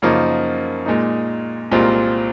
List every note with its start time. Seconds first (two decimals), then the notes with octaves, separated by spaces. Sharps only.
0.02 F#2 C#3 F3 A#3 D#4
0.86 A#2 G#3 D#4
1.71 C2 A#2 G#3 C4 F4